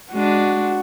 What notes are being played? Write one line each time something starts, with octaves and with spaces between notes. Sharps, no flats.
G#3 D4 F#4